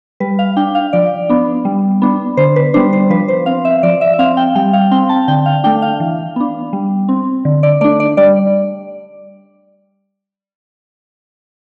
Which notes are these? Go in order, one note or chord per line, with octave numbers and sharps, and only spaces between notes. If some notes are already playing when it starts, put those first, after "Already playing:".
G3 B4
F5
D4 G5
F5
F3 D5
B3 D4
G3
B3 D4
D3 C5
B4
G3 B3 D4 C5
C5
F3 B4
C5
C4 F5
E5
F3 D5
E5
E5
C4 F5
G5
G3 G5
F5
C4 G5
A5
D3 G5
F5
A3 D4 G5
F5
E3
B3 D4
G3
C4
D3
D5
A3 D4 D5
D5
G3 D5